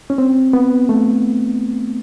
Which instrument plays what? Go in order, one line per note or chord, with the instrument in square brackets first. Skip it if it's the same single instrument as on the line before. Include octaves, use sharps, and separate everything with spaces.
[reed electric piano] C#4
C4
B3
A3